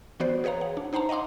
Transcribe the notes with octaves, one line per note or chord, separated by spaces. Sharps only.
E3 B3 F#4 C5 D5
G#4 B4 C#5 F5 A#5
F#5
D4
D#4 C5 F#5 A5 A#5
D#5 F5 F#5 C6 D6